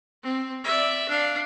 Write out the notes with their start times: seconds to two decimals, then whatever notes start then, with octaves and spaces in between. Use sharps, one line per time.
0.23 C4
0.64 D5 E5
1.09 D4 F5